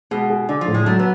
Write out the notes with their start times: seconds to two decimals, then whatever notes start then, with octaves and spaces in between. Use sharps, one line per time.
0.11 B2 G#3
0.30 G#4
0.49 D3 D4
0.61 F3
0.67 A2
0.74 G#3
0.86 F#3 A3
0.99 B3